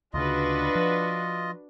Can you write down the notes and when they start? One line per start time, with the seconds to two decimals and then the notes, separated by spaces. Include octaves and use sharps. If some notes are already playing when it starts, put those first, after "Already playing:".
0.14 D2 C#3 D4 F4 F#4 B4 D#5
0.75 F3